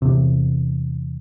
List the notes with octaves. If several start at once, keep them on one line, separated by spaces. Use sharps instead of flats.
E2 C3